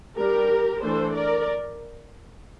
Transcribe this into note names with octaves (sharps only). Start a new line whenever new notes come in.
G3 D4 G4 A#4
E3 A3 D4 A4 C5
A#4 D5